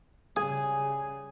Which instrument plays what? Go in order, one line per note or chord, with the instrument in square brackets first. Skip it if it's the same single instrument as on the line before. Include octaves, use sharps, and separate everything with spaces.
[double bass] C#3 G3 [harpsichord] G#4 [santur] G#5